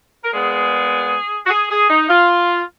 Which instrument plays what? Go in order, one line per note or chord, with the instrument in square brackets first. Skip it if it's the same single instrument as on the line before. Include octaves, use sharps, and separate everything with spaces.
[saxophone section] A#4
A#2 G#3 B3 G#4
F#4
G#4
G#4
D#4
F4